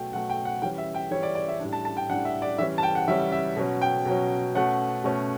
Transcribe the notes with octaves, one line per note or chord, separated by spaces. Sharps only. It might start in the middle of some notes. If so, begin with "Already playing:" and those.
Already playing: B2 F#3 A3 G5
B2 F#3 A3 F#5
G5
F#5
E3 G3 C#4 G5
E5
G5
E3 G3 C#4 C#5
D5
D5
E5
A2 G3 D4
A5
A5
G5
A2 G3 D4 F#5
E5
D5
E3 G3 C#4 E5
A5
G5
F#5
E3 G3 C#4 E5
E5
B2 F#3 C#4
G5
B2 F#3 C#4
B2 A3 C#4 F#5
B2 A3 C#4